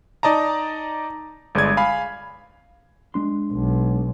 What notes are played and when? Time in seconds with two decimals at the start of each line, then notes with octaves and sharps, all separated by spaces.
0.23 D#4 D5 D#5 A5 A#5
1.55 G1 G#3 D5 G#6
1.77 F5 G#5 B5
3.14 G#3 D4 C6
3.52 B1